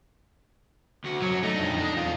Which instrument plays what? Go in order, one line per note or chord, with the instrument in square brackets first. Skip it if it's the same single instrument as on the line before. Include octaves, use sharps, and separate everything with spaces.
[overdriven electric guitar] D2 F#4
[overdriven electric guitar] F#2 C#5 [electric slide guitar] F#3
[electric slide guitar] A3 [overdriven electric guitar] D#4
[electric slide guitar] F2 D4
D4
E2 F4